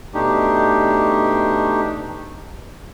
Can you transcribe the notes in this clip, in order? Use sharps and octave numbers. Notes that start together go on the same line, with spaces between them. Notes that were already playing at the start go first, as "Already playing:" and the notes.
B2 A3 D4 D#4 G4